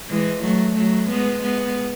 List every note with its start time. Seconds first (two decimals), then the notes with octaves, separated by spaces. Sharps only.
0.10 E3 G#3
0.43 F#3 A3
0.76 F#3 A3
1.10 G#3 B3
1.43 G#3 B3